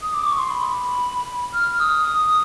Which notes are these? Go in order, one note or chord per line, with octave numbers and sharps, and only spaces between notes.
D#6
D6
C#6
C6
B5
F6
D#6